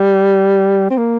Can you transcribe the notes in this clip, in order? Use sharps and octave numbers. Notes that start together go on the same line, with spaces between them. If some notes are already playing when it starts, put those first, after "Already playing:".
Already playing: G3
C4
A#3